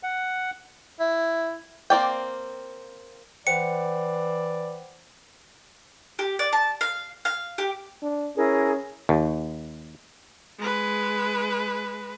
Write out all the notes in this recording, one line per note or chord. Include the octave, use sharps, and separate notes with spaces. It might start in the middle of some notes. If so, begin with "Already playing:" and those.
F#5
E4
A#3 C4 D5 G5
E3 C5 D5 F#5 G5 C#7
G4
D5
A5
F5
F5
G4
D4
C#4 E4 G#4 A#4
D#2
G#3 B4